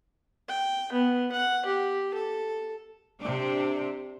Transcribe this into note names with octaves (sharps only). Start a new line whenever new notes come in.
G5
B3
F#5
G4
A4
C3 D4